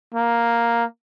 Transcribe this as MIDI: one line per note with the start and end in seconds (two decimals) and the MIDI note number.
0.15 0.84 58